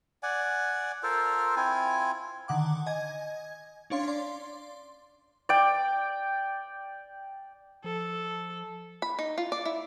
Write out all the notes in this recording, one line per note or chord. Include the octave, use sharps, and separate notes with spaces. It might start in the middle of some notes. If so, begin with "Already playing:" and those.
D5 F#5 G#5
F4 A4 A#4 C5
C4 E4 F4 G#5
D3 D#3 F#5 D6
D#5 G#5 G#6
C#4 D4 C#5 F5 C6
D5 C6
D5 G5
F3 A4
B5
D#4
F4
D5
E4